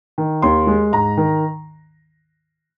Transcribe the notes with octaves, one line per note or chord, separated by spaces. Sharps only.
D#3
D#2 C6
G#3
G#2 A#5
D#3